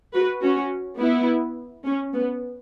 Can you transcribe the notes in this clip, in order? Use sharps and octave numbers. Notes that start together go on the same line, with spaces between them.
F#4 B4
C#4 F#4
B3 E4
C#4
B3